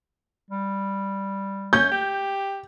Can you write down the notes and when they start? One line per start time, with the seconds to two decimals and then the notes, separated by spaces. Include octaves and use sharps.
0.50 G3
1.73 C#4 G6
1.91 G4